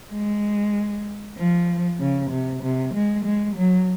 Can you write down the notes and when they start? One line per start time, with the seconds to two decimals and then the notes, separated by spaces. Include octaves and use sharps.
0.11 G#3
1.37 F3
1.99 C#3
2.30 C3
2.63 C3
2.94 G#3
3.25 G#3
3.56 F#3